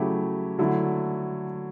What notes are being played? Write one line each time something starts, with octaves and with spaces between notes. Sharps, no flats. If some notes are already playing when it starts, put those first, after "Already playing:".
Already playing: C#3 F#3 A3 E4 G4
D3 F#3 A3 E4